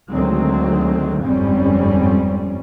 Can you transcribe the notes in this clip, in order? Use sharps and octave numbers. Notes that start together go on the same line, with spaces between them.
D2 D#3 F#3 G#3 C4
G1 F2 G#2 G3 C4 C#4